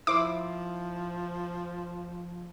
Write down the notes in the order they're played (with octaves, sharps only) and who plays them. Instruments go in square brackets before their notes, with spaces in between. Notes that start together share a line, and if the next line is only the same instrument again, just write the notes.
[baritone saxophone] F3 [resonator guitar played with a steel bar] E4 C5 [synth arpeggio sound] D6